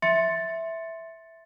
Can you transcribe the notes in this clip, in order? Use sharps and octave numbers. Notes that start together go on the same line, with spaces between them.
E5 C6 A6 C#7